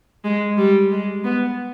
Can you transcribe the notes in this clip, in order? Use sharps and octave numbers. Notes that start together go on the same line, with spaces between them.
G#3
G3
G#3
B3